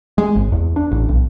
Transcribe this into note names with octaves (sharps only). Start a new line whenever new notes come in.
G#3
G#1
E2
D4
A1
B1